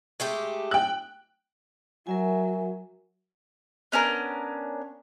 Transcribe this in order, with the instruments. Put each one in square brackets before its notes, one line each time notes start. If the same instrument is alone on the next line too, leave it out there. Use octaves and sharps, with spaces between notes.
[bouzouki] G#3 A3 G4
[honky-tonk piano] G5 F#6
[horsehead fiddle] F#3 [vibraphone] A#4 E5 G#5
[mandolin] B3 C#4 D4 A#4